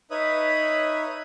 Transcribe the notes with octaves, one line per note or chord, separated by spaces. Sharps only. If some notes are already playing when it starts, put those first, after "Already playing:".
D#4 B4 C#5 E5 B5 D#6